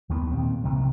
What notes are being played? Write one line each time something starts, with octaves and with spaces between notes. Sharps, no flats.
D#2 D#3 A3 B3
A#2 C4
C2 C3 D#3 A3